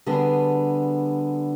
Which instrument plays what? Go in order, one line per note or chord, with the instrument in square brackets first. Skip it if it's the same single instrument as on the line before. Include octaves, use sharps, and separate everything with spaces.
[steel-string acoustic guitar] D3 G3 B3 D4 G#4